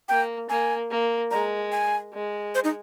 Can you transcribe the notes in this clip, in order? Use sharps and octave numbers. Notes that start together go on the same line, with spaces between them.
A#3 G5
A#3 G#5
A#3
G#3 A#5
G#5
G#3
C5
D#4